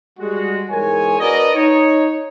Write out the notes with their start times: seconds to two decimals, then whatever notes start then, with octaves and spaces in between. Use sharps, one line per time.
0.19 G3 G#3 F#4
0.70 E2 G#2 G#3 A#4 C#5 G#5
1.19 D4 F#4 A#4 B4 D5 D#5
1.54 D#4 C#5